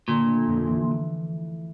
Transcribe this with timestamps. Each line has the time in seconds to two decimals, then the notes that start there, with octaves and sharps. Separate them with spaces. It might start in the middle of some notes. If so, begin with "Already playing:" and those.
0.08 A#2 D3
0.27 A3
0.48 F2
0.67 E3